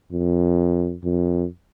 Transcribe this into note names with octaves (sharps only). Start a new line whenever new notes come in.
F2
F2